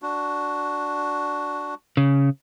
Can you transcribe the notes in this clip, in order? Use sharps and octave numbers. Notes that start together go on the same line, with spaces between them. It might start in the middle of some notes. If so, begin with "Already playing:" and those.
D4 F#4
C#3